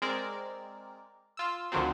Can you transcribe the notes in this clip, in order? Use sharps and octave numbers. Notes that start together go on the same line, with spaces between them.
G#3 C4 A#4 D5
F4 E6
D2 D3 D#3 F3 F#3 C4